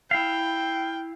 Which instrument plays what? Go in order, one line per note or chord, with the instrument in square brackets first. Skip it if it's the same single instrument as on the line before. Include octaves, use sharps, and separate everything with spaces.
[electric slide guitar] E4 F5 [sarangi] G5